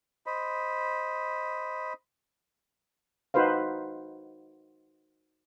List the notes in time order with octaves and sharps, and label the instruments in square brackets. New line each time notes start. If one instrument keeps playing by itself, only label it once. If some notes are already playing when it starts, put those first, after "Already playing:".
[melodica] C5 D#5 B5
[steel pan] D#4 F#4 B4 C5 F5